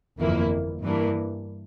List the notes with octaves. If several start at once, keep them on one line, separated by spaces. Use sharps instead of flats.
G1 F2 E3 A#3 E4
G2 E3 A#3 D4